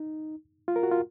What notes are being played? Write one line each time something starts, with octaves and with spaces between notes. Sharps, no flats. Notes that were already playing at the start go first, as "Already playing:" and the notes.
Already playing: D#4
F4
A#4
F#4
F4